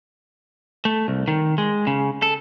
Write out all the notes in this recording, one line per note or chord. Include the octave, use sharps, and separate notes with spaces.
A3
C2
D#3
G#3
C#3
A4